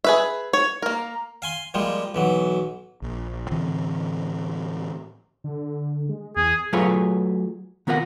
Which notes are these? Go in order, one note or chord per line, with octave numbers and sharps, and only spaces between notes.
G#4 B4 E5
C#5
A#3 A#4
F5 G#5 C6
F3 G3 G#3 A#3
B1 E3 F#3
A#1
A2 D3 E3 C4
D3
G#3
E2 G#4
F#3 A3 F4 G#4 B4 C#5
D#3 B3 F4 A#4 F#5